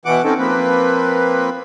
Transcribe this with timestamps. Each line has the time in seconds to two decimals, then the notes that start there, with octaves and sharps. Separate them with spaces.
0.05 B2 E3 F#5 D6
0.24 C4 C#4 D#4 A4
0.38 F3 A#3 C4 B4